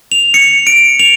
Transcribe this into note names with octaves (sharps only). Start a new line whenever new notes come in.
F7
C#7
D7
F7